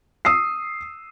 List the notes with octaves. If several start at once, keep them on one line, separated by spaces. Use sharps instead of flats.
D#6 E6 C7